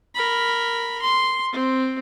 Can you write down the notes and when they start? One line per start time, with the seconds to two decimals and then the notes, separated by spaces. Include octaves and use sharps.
0.15 A#4 B5
1.02 C6
1.52 C4